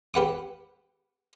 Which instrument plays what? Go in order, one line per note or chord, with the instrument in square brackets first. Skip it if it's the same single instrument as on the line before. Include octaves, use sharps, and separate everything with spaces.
[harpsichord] G4 B4 F#5 D6